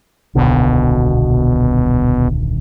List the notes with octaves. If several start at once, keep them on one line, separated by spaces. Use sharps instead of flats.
D#1 C2 B2 D3